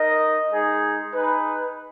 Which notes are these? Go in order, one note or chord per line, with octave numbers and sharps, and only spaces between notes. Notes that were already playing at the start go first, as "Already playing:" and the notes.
Already playing: D#4 A#4 D#5
G#3 D#4 G#4
D#4 G#4 B4